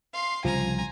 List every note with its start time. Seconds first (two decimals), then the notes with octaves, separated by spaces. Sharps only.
0.13 F5 C6
0.45 C2 C#3 F3 G#5 A#5